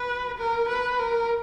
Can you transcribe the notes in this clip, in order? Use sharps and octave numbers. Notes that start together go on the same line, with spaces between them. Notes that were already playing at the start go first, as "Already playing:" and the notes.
Already playing: B4
A#4
B4
A#4